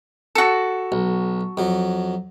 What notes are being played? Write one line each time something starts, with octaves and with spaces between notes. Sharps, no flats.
F#4 A4
B1
F2 F#3